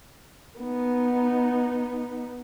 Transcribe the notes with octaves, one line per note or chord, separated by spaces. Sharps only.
B3 D#4